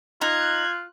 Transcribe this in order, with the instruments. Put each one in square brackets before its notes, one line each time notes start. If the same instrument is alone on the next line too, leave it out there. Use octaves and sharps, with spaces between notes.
[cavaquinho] D#4 [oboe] F4 [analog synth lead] F#6 [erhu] G#6